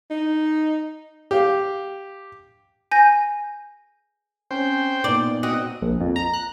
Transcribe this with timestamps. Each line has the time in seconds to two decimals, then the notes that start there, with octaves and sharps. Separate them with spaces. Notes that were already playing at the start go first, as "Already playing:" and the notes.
0.11 D#4
1.31 G4 F5
2.91 G#5 G6 A#6
4.51 C4 C#4 C5 G5
5.04 A#2 B3 D#4 D5
5.43 C4 F#4 D#5
5.82 A#1
6.00 F2
6.16 A#5
6.33 F#6